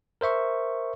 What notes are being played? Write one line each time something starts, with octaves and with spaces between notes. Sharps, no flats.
A#4 C5 E5 C#6